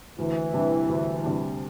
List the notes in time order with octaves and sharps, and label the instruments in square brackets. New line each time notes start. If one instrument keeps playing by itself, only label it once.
[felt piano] D2 [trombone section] E3
[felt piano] C3 G3 D4
D2
C3 G3 D4